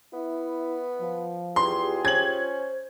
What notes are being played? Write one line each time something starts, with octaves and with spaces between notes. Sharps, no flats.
B3 E4
F3
E2 F4 G4 G#4 C6
C#4 C5 G#6 F#7